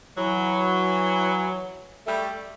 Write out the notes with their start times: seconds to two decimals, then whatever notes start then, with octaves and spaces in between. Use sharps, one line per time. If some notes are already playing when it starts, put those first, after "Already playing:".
0.17 E3 F#3
2.07 G3 A3